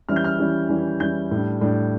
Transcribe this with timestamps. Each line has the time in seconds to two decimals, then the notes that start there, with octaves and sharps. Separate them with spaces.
0.09 E3 G3 C#4 E4 F6
0.16 G6
0.24 F6
0.39 E3 G3 C#4 E4
0.69 E3 G3 C#4 E4
1.00 E3 G3 C#4 E4 G6
1.31 A2 G3 D4
1.61 A2 G3 D4